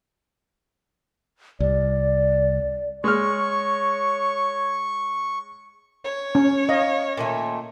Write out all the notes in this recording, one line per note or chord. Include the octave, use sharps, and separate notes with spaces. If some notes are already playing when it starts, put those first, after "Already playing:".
C2 D5
G#3 C#5 C#6 F6
C#5
C#4
D#5 F5
A#2 D#3 A3